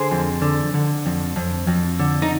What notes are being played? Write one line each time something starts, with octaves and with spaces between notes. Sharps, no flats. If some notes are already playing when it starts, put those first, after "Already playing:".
Already playing: D3 G#4 C5
F2
D3
D3
F2
F2
F2
D3
D#4